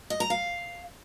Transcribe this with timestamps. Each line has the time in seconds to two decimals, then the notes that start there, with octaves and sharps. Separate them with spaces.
0.10 D#5
0.20 A#5
0.30 F5